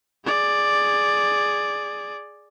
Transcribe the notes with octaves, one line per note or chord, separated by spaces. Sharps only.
G#4 D5